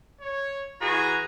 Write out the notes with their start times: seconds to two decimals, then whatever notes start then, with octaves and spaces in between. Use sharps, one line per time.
0.21 C#5
0.81 E3 F#4 G#4 A#5